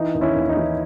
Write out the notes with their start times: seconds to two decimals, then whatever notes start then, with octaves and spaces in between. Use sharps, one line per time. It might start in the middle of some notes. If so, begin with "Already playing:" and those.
Already playing: E3 D#4
0.15 D#2
0.21 C#4 E4
0.36 D#2
0.49 D#4
0.57 E3